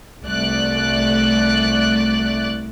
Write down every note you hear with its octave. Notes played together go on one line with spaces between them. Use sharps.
C2 A3 D5 F#6